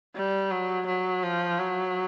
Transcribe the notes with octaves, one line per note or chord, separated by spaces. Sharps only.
G3
F#3
F#3
F3
F#3